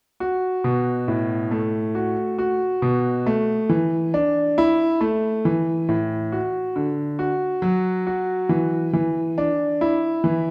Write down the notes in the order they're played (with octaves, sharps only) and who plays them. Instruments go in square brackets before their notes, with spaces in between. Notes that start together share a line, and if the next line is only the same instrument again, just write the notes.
[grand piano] F#4
B2
A2
A3
F#4
F#4
B2
A3
E3
D4
E4
A3
E3
A2
F#4
D3
F#4
F#3
F#4
E3
E3
D4
E4
E3